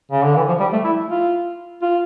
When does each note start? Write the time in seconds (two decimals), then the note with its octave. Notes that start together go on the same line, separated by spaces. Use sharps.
0.11 C#3
0.24 D3
0.36 E3
0.48 F3
0.60 G3
0.72 A3
0.84 E4
1.08 F4
1.82 F4